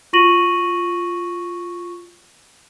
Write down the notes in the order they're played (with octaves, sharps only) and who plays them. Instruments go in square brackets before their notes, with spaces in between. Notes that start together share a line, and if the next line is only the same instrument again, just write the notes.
[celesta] F4 F#4 C#6 A#6 D#7 F#7